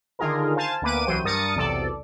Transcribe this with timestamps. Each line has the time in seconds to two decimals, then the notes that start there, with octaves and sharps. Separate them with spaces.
0.19 D3 D#3 D#4 F4 G#4 A#4
0.56 C5 F5 G#5 A5
0.82 D2 A#3 B3 B4 D6 D#7
1.06 C2 E3 F#3 C5 G5 D#7
1.24 G2 A#4 D#6 A6 C#7
1.56 B1 E2 C3 A4 D5